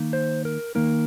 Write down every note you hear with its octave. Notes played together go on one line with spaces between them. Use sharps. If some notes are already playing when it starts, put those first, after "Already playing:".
Already playing: D#3 A#3 D#4
C5
A#4
D#3 A#3 D#4 A#4